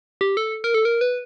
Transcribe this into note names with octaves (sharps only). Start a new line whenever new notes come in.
G4
A4
A#4
A4
A#4
B4